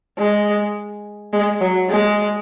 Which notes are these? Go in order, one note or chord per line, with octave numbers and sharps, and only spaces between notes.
G#3
G#3
F#3
G#3